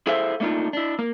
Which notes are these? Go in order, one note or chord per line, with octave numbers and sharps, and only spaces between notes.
E4 G#4 A4 C5 E5 F5
A3 A#3 D4 D#4 F4
D4 E4
A#3